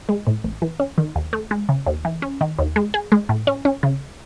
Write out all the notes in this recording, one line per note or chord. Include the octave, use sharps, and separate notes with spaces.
G#3
A2
A1
E3
C#4
D#3
D#2
A3
G#3
C#3
D#2
E3
C#4
D#3
D#2
G#3
G#4
G#3
A2
C#4
C#4
C#3